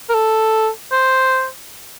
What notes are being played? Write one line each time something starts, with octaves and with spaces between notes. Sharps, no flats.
A#4
A4
C5